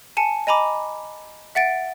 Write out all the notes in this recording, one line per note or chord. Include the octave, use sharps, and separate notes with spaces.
G#5 A5 C#7
D#5 G#5 A#5 B5 D6
E5 F#5 A6 D7